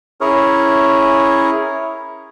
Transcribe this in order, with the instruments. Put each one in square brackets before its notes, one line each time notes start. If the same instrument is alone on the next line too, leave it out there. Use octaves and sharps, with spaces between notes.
[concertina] C#4 E4 G#4 A#4 C#5